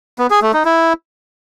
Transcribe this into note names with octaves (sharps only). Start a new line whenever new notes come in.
B3
G#4
A3
D#4
E4